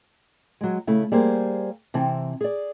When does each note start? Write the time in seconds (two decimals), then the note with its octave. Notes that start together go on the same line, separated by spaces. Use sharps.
0.61 F#3 G#3
0.87 C#3 A3 E4
1.12 G3 A#3 G#4 C5
1.94 C3 E3 C4 A5
2.41 G#4 D5